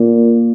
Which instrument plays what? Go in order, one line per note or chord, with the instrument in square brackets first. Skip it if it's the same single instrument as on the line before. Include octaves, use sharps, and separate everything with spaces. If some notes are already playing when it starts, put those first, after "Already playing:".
Already playing: [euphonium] A#2 [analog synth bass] A#3